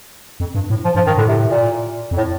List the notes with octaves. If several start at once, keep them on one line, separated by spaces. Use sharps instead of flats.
F2
G2
A2
F3
G2 F3
G2 D#3
A2 D3
C3
A#2
F2
A2